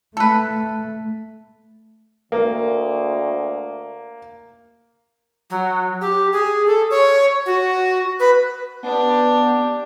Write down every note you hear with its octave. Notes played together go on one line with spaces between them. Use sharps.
A3 A4 B4
D2 A#3
F#3
G4
G#4
A4
C#5
F#4
B4
B3 D4 G4